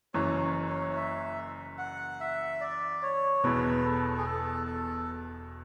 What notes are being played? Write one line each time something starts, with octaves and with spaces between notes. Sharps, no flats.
F#1 F#2 E3 C#5
C#5
E5
F#5
E5
D5
C#5
E1 E2 B2 B4
A4
G#4
A4
A4